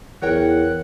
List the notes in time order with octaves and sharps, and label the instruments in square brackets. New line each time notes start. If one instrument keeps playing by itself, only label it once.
[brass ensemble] E2 [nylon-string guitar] A#4 C#5 G5 [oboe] F#5